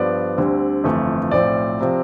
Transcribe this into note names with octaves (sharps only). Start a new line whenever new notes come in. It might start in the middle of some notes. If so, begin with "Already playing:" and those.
Already playing: G2 F3 B3 D5
D2 D3 G3 C4
G1 F2 E3 A3
B1 A2 F3 C4 D5
C3 F3 C4